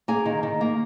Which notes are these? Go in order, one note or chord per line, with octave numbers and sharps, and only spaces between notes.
A#3 G#4 G#5
D#3
D#3
A#3